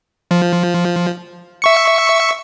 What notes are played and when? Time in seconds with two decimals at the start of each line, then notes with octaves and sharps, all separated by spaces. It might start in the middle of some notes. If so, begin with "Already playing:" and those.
0.31 F3
1.62 E5 C#6 C#7